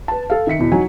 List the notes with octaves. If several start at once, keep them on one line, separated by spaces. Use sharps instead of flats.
B4 A5
A4 F5
D#3 E5 B6 C#7
E2 B2
F#3 D#4 G#5